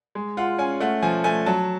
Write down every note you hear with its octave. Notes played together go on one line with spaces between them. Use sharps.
G#3
F4 F#5
C#4 G#5
A3 F#5
F3 G#5
A3 G#5
F#3 A5